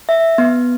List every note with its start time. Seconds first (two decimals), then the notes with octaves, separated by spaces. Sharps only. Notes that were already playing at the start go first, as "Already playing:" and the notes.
0.09 E5
0.38 B3